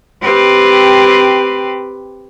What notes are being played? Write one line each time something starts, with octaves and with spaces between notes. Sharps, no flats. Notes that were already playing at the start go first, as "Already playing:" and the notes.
C4 G4 B4